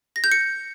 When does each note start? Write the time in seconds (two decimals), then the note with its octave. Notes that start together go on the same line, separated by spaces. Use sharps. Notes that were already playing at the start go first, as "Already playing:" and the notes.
0.16 A#6
0.24 G6
0.32 C#7